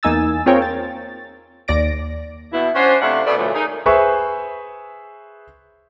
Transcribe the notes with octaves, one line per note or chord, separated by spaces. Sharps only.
E2 A#3 D#4 G#5 E6 A6
C4 F4 G#4 A#4 C#5 G5
A6
D#2 D5 A#6 D7
B2 E4
C#4 D4 F#4 C5
C3 A3 D4 E4 F5 F#5
B2 A3 D5
A#2 D3 E3 F#3 G#3 A3
D#4 G#4 A#4
G#4 B4 C5 E5 G#5 C#6